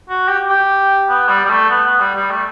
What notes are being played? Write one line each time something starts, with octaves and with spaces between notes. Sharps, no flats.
F#4
G4
G4
B3
G3
G3
A3
B3
B3
G3
G3
A3